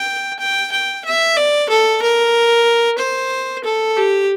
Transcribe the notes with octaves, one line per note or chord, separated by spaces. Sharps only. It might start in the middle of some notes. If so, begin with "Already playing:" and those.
Already playing: G5
G5
G5
E5
D5
A4
A#4
C5
A4
G4